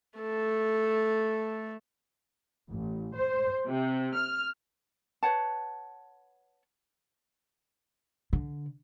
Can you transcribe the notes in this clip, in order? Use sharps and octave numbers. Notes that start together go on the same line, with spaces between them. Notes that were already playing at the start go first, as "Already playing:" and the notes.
A3 A4
A1
C5
C3
F6
B4 C#5 F#5 A5
D3